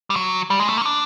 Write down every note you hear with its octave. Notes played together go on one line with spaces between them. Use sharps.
G3
F#3
G3
G#3
A3
A#3
C#4
D4